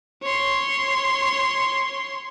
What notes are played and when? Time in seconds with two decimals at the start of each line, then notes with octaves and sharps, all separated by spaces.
0.23 C#5 C6